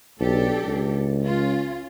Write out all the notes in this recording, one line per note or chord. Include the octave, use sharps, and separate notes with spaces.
B1 D4 G4 A4
C#2
C#4 F4